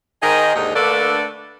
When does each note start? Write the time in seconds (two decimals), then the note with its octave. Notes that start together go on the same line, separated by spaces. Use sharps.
0.23 D#3 G#4 A#4 C5 D#5
0.55 D#2 G#2 D3 D#4 A#4
0.75 D3 A3 A#3 D4 A4 B4